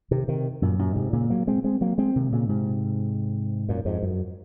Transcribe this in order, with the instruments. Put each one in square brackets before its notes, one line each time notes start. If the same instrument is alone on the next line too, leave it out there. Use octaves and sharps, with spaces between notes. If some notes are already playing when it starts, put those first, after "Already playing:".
[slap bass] C3 D#3
C3 D#3
F#2 A#2
F#2 A#2
G#2 C3
A#2 C#3
F#3 A#3
G#3 C4
G#3 C4
F#3 A#3
G#3 C4
C3 D#3
A#2 C#3
G#2 C3
F#2 A#2
F2 G#2
F#2